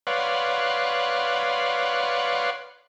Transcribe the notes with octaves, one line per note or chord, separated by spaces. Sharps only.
B4 C#5 D5 F5 F#5 C6